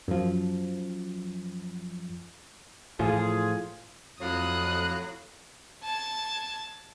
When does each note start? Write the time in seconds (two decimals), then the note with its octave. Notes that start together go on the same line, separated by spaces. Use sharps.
0.08 F#2 F3
2.99 A2 E3 F3 F4 G#4
4.21 F2 A2 F#3 F5 D#6 F#6
5.83 A5 G#6